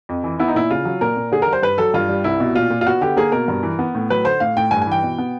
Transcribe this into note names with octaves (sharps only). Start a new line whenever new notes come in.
F2
E3
B3 E4
D#4
A#2 E4
C#3 F4
F#3
A#2 A#4
A#2
D3 G#4
A#4
G3
C5
G2 B4
F#3 A4
G2 F4
G3
C2 E4
B2
A#2 F4
A#2
F4
B3 F#4
D3 G4
A#3 G#4
B2 A#4
G2
E3
B3
A2
F#3 B4
D3 C5
A2 F5
A2 G5
G2 G#5
G#5
E3 G5
B2
B3